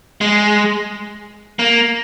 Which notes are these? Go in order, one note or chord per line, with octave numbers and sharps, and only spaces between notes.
G#3
A#3